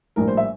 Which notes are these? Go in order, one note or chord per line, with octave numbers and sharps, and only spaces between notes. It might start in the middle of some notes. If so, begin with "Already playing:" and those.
A#1 A2 G3 A#3 A#4
C5
E5